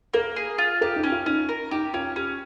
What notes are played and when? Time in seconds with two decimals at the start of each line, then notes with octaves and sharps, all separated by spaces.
0.14 A#3 A#4
0.36 G#4
0.58 F4
0.81 G4 A#4
0.96 D#4
1.03 C#4
1.12 F4
1.26 C#4 D#4
1.49 A#4
1.71 D#4 G4
1.94 C#4 F4
2.16 C#4 G4